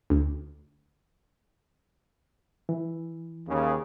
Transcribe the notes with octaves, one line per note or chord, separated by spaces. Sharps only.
D2
E3
D#2 C#3